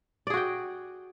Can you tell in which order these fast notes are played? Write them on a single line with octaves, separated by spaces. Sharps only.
D5 G#4 F#4 G5